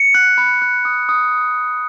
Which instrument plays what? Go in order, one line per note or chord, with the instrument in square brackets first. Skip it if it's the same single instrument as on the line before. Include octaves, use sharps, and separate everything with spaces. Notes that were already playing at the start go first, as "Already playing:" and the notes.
Already playing: [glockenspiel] C#7
F#6
B5
F#6
D#6
D#6